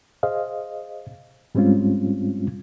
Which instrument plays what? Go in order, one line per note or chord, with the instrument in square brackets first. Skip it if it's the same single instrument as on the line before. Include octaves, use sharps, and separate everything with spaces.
[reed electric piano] G#4 C5 D#5 F5
G#2 G3 G#3 C4 C#4 F4